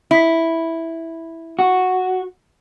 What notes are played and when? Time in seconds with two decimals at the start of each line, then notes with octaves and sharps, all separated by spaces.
0.11 E4
1.59 F#4